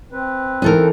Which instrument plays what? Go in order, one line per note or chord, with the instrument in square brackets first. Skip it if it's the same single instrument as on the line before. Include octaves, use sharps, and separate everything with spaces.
[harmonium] C4 B4
[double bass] E3 [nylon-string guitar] D#4 A4 A#4